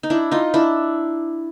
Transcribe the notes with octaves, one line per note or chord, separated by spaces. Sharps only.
D#4
D4 E4
D#4 F4
D4 E4